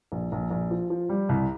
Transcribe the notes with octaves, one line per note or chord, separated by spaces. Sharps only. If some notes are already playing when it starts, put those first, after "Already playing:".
A#1
A#1
A#1
F3
F3
G3
C2